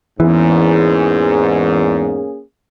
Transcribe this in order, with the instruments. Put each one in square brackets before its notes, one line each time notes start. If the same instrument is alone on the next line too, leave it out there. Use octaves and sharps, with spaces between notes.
[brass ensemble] E2 G#2 [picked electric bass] E3 [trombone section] A#3 C#4 G#4